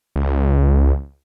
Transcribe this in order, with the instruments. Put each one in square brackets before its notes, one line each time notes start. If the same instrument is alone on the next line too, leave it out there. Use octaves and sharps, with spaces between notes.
[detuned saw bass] C#2